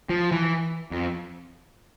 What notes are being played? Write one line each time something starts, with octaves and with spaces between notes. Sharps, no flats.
F3
E3
F2